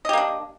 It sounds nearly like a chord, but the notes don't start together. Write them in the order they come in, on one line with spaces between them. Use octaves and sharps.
D#5 G4 A#3 D4